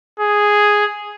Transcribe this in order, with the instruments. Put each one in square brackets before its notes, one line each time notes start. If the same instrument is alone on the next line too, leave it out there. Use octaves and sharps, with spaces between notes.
[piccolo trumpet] G#4